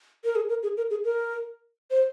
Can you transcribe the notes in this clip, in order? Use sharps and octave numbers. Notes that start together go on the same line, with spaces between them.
A#4
G#4
A#4
G#4
A#4
G#4
A#4
C5